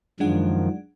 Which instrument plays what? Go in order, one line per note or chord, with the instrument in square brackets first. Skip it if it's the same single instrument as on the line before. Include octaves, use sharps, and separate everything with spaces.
[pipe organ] F#2 D#3 F3 [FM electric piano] G#3 D4 F#5